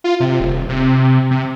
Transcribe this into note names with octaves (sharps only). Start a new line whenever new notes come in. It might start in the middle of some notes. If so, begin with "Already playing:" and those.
F4
C3
D#1
C3
C3